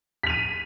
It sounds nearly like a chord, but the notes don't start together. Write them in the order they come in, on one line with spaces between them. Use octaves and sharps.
B6 F7 D#7